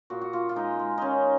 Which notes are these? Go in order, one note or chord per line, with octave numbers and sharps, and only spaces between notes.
A#2 F#4
F#4
A#2 F4
F4
G#3 D#4
G#3
D#3 C#4 D#4